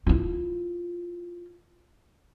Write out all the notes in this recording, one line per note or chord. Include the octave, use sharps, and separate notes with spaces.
E4 F4